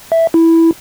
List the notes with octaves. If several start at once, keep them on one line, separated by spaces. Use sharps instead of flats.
E5
E4